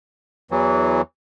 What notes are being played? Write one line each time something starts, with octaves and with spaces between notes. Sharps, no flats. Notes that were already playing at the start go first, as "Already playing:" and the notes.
E2 E3 F#3